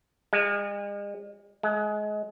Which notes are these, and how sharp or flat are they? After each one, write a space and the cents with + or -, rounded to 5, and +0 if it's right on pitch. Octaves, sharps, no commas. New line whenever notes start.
G#3 -40
G#3 +25